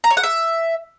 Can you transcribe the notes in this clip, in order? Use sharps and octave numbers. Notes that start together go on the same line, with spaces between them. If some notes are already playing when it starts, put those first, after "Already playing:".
A#5
C#5
F#5
E5